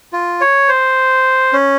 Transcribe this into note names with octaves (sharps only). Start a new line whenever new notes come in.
F4
C#5
C5
C#4